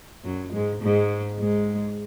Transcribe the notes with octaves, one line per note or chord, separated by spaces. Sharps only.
F#2 F#3
G#2 G#3
G#2 G#3
G#2 G#3